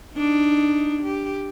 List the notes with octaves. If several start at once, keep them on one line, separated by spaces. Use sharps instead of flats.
D4 D#4
G4